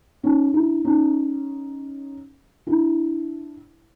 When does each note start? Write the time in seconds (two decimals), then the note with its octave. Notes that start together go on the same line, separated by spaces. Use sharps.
0.23 C#4 D#4
0.54 D4 E4
0.84 C#4 D#4
2.67 D4 E4